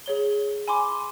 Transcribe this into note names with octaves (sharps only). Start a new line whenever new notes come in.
G#4 C#5 G7
G#5 B5 C6 D6